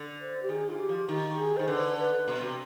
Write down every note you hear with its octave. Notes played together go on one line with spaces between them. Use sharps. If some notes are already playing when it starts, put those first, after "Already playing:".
Already playing: D3
C5
G4
D#3 G#4
D3 F4
G4
F3
D#3 G4
G4
G#4
D#3 C5
D3 B4
B4
B2
C3